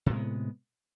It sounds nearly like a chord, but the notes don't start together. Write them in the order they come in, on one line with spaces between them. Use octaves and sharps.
C3 A2 G#3 B3